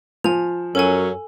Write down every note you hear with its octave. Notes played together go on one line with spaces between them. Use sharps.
F3 G#5 F7
F#2 F#3 C#4 A4 G#5